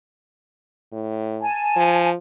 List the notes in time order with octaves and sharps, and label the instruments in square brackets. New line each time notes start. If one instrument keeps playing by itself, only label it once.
[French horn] A2
[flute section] G#5 A5
[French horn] F3